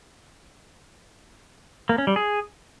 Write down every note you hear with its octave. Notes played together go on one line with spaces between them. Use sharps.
A#3
C#4
G3
G#4